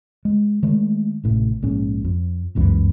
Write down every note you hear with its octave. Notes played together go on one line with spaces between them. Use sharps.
G#3
D#3 G#3 A3
A1 A2 C3
A#1 G#2 C#4
F2
G1 C#2 F#2 E3